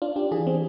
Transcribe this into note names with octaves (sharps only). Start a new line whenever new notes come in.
D4 F4
D4 G4
E3 G#4
C4